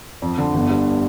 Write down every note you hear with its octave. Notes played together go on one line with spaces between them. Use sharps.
F2
D3
G1
G2